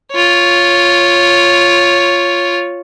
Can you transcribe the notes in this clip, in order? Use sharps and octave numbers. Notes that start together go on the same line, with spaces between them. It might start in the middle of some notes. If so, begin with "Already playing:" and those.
F4 C#5